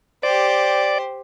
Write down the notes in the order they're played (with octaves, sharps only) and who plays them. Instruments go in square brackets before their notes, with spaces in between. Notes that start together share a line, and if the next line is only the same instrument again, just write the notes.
[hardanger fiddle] G4 C5 [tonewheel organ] D5